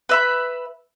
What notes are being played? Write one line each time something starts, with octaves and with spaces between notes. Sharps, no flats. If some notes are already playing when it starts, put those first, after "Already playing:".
B4 E5 B5